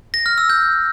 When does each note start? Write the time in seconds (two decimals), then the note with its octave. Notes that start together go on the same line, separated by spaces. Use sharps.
0.14 A#6
0.26 F6
0.38 E6
0.50 G6